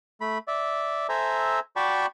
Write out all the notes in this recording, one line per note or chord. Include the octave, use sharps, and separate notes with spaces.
A3 B5
D5 E5
A4 C5 E5 G#5 A#5
F#4 D5 G5 A5 B5 C#6